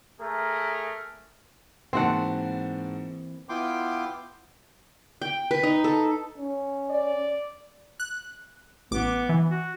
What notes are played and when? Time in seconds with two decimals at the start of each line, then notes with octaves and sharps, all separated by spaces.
0.20 A3 G#4 A#4
1.93 G#2 E3 A#3 C4 F#4 F#5 A5
3.49 B3 E4 F4 G5 C6 D6
5.22 G5
5.51 B4
5.63 D#4
5.84 A4
6.38 C#4
6.90 D5
8.00 F#6
8.91 A1 B3 D6
9.29 E3
9.51 F#4